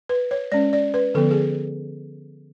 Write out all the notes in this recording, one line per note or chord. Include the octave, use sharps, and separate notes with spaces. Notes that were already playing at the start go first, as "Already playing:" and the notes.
B4
C#5
G#3 C#4 D5
D5
B4
D3 F3 B3 A4
G#4